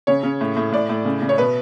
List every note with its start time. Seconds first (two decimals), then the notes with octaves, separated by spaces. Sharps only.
0.07 C#3 C#5
0.23 C#3
0.41 A2
0.57 A2
0.72 A2 D5
0.89 A2
1.05 C#3
1.22 C#3
1.29 C#5
1.38 B2 B4